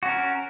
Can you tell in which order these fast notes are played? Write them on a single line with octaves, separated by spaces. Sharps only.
F#4 C#4 A#4